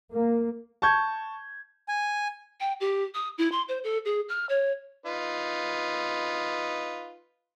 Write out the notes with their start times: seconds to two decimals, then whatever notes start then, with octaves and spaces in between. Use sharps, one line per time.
0.12 A#3
0.82 A5 C#6 G6 G#6
1.89 G#5
2.60 G5
2.80 G4
3.14 D#6
3.38 E4
3.52 C6
3.68 C5
3.84 A4
4.05 G#4
4.29 F6
4.49 C#5
5.06 D#4 F4 B4